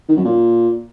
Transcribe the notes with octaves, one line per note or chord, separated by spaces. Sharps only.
D#3
F#2
A#2